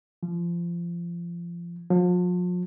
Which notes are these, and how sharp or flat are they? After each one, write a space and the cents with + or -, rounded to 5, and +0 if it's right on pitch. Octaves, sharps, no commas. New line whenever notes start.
F3 -25
F3 +40